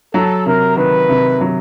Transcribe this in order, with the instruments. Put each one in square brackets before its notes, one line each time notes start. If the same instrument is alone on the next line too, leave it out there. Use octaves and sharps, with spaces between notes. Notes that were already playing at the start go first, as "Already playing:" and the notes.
[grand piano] F#3 [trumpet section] A4
[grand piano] C3 [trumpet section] A#4
[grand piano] D#3 [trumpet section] B4
[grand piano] C3
F#3